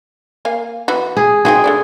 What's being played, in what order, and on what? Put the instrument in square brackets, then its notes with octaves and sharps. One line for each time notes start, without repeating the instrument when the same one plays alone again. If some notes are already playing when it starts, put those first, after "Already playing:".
[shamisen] A#3 F5 G#5
E3 B3 F#4
[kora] G#4
[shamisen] C4 D#4 F#4 [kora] G#4
[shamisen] A3 D4 D5